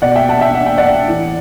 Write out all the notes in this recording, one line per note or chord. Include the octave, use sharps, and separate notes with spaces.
B2 D5 F#5
E5 G5
F#5 A5
E5 G5
F#5
G5
D5 F#5
A2 E3